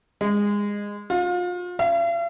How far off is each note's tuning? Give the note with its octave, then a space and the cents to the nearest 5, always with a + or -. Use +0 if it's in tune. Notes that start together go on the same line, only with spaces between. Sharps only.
G#3 -20
F4 +30
F5 -45